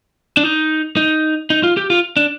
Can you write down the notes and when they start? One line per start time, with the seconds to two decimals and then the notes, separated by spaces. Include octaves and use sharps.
0.37 D4
0.44 D#4
0.97 D#4
1.50 D#4
1.64 F4
1.77 G4
1.90 F4
2.17 D4